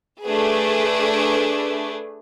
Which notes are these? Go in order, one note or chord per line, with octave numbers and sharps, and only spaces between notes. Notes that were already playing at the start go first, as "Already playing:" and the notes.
A3 D4 G#4 B4